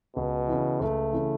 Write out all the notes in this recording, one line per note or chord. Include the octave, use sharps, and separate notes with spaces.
C#2 B2
C#3 E3
C#2 A3
C#3 E3